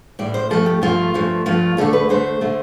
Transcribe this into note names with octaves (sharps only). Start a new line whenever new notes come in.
A2 G3 D5
C5
G2 F3 A3 A4
G4
G2 F3 A3 F4
G2 F3 A3
G2 F3 A3 F4
D2 D3 A3 A4
B4
D2 D3 A3 C5
D3 A3